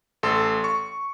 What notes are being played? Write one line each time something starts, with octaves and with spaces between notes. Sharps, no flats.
A1 A4 C6
C#6